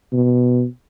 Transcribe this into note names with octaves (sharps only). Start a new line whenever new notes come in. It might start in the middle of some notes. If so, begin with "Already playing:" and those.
B2